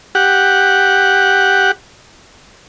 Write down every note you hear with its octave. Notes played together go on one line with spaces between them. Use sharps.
G4 F#5